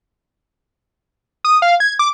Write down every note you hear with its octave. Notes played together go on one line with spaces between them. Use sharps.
D#6
F5
G#6
D6